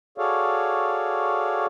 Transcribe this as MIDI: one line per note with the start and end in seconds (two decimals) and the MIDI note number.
0.18 1.66 66
0.18 1.66 68
0.18 1.66 69
0.18 1.66 73
0.18 1.66 74
0.18 1.66 77